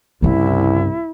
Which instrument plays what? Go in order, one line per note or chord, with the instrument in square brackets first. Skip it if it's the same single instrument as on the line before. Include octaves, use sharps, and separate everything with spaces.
[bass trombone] C2 [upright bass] G2 C#3 [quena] E4